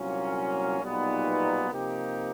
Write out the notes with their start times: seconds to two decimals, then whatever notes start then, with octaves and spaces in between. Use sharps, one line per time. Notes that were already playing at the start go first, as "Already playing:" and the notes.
Already playing: C2 A#2 F#3 A#3 C#4
0.81 B1 A#2 G3 B3 D#4
1.70 C3 F3 A#3 D#4 G4